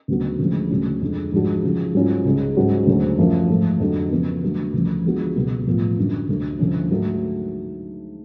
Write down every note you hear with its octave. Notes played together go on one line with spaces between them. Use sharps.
D2 C#3 F#3 B3 F#4
D2 C#3 F3 G#3
D2 C#3 F#3 C#4
F2 D3 G#3
G#2 F3 G#3 D4 F#4
C#3 F3 G#3
G#2 F#3 C#4 F4
C#2 C#3 G#3
G#2 F#3 C#4 F#4
D2 C#3 F#3 C#4
F#2 F3 A3
G#2 F3 A3
F2 D3 F#3
C#3 F3 B3
D3 F#3 A3
D2 C#3 F3
D3 F3 G#3 B3 F#4
C#2 B2 F#3 B3
A2 F3 B3 F4
F#2 D3 F#3
D2 D3 F#3 A3
D2 D3 F3 A3 C#4
G#2 F#3 A3